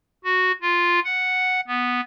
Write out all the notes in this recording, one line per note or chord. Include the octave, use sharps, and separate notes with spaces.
F#4
F4
F#5
B3